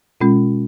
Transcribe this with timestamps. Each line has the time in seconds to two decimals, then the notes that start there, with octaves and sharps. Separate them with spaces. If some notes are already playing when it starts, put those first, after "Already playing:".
0.21 B2 G#3 C#4 F4